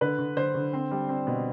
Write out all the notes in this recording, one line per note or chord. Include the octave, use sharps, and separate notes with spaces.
D3 B4
D3
D3 C5
D3
C4
G3
C4
B2